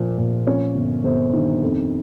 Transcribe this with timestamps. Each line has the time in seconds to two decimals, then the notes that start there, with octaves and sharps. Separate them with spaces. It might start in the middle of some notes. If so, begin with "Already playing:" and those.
Already playing: A#1 A#2 F3
0.18 A#2
0.46 F3 C#4 C#5
0.75 G1
1.04 G1 C4 C5
1.33 G2 D#3 D#4
1.63 F2